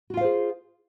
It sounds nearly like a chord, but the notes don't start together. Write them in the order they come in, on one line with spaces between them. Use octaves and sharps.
F#4 F4 F5 C5 G#4